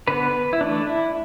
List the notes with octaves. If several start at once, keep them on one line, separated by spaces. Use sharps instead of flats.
D3 B3 B4
E4
E3 A3 D4
E4